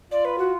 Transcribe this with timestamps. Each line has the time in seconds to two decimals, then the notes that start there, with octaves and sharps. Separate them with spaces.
0.11 F4 D5
0.25 B4
0.38 F#4